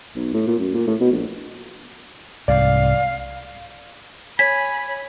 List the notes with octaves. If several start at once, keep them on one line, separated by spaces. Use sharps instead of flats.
B1
A2
A#2
F#2
A#2
A2
B2
A#1
C2 G#2 D5 F5
C#5 G#5 B5 B6